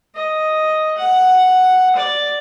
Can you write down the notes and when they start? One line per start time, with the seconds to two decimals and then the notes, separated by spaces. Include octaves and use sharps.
0.15 D#5
0.98 F#5
1.96 D5